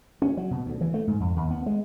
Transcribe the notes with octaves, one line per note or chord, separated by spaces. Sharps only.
C#4
F#3
B2
D2
E3
A3
G#2
F2
D#2
B3
G#3